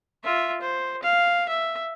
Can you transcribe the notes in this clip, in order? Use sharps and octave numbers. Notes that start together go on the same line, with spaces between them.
F4 E5
C5
F5
E5